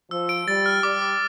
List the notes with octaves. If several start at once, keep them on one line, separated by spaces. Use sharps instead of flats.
F3 E6
D7
G3 A6
F6
G3 D6
D6